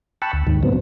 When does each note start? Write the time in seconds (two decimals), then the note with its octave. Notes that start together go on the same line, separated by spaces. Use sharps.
0.22 G5 A5 B5 C#6 E6 F#6
0.33 D2
0.47 D#2 G#2 D#3
0.63 A2 D3 F#3 B3 C4